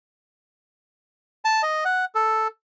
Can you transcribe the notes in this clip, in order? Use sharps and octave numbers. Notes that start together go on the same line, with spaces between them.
A5
D#5
F#5
A4